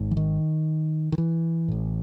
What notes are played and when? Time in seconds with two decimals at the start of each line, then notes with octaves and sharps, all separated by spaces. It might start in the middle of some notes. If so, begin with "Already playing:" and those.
Already playing: G#1 G#2
0.11 E3
0.17 D#3
1.12 D#3
1.18 E3
1.68 A1 A2